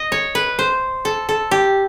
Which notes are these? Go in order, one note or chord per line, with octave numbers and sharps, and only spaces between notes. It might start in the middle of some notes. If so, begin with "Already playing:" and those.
Already playing: D#5
C#5
B4
C5
A4
A4
G4